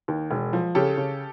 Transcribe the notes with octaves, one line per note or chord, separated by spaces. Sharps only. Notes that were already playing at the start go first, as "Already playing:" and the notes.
D#2
E1
F3
C#3 G4 A4
C#3